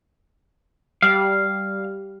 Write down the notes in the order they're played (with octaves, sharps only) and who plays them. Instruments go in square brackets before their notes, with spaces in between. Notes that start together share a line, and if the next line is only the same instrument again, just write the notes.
[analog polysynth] G3 [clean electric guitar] F5